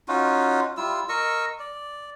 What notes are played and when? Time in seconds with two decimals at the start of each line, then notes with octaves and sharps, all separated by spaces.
0.08 C#4 D#4 F4 F#4
0.77 G3 E4 F4 E6
1.09 A#4 D#5 C#6 E6
1.59 D5